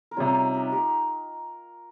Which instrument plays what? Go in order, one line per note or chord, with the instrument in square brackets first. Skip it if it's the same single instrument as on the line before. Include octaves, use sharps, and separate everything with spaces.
[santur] A#4
[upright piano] C3 G3 C#4 [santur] F4 G#4
[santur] D#4 G4
D#4 G4
G4 A#4